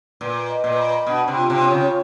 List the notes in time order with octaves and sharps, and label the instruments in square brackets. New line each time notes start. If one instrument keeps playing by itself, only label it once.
[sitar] A#2 [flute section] B4
[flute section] D#5
[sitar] A#2
[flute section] B5
[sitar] B2 [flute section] D4
[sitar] C3
[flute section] F4
[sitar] C3
[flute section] C#5
[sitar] C#3